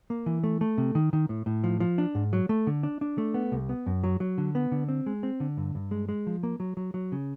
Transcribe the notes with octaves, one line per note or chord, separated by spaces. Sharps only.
A#3
E3
A3
A3
C3
D#3
D#3
A2
A2
F3
F3
D4
G#2
F#3
A3
D3
D4
D4
A3
B3
C2
B3
F#2
F#3
F#3
D3
B3
D3
C4
G#3
C4
D3
G2
G2
G#3
G#3
F3
A#3
F#3
F#3
F#3
C#3